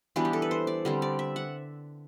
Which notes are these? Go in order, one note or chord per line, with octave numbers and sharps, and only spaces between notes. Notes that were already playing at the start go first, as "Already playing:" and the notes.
E3 G3 B3 D4 F#4
G4
A4
B4
C5
D5
D3 G3 C4
D5
E5
F#5